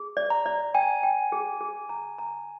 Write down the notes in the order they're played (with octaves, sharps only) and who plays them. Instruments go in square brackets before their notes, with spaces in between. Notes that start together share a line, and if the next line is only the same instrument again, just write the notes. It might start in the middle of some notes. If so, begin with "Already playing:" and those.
Already playing: [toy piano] G#4
D5
[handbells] A#5
[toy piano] D5
[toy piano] G5 [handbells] G#5
[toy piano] G5
G#4
G#4
A#5
A#5